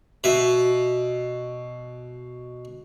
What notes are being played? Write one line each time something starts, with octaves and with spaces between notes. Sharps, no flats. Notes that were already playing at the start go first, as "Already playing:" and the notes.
B2 E5